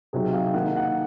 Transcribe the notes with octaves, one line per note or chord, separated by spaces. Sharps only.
C3 F#3 C4 D#4 G#4
F5
D#3 A#3 D#4 F#5
F5
F#5